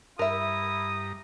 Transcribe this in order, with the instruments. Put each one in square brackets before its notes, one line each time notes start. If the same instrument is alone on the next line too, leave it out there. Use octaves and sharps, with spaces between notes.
[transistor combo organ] G2 A#5 [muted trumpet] E4 [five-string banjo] A#4 E5 [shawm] D#6